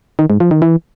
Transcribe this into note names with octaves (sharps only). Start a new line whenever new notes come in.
D#3
G#2
F3
D#3
E3